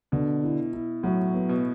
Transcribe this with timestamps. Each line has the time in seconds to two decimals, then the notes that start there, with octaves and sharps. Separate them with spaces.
0.12 B2 D3
0.44 E4
0.73 E4
1.03 A2 F#3
1.34 B3
1.49 B2